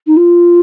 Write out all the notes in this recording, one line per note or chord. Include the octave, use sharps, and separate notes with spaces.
D#4
F4